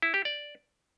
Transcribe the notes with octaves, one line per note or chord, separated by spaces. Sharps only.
E4
G4
D5